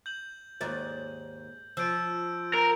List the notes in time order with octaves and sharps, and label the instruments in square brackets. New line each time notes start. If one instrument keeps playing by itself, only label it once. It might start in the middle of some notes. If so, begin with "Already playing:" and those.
[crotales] G6 F#7
[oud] D#2 G#2 D5
[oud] F3 [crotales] E6 G6 D7
[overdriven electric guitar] A#4